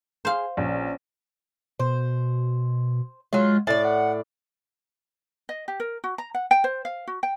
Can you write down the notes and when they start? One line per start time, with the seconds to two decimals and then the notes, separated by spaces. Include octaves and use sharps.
0.25 G#4 C5 F5
0.57 A#1 C#4
1.80 B2 C5
3.33 F#3 G#3 F4
3.67 A2 D5 A6
3.85 F#5
5.49 D#5
5.68 G4
5.80 A#4
6.04 F#4
6.18 A#5
6.35 F#5
6.51 G5
6.64 C5
6.85 F5
7.07 F#4
7.23 G5